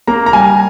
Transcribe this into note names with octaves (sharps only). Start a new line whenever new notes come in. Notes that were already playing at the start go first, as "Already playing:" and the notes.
A#3 A#5
A#5
G3 G#5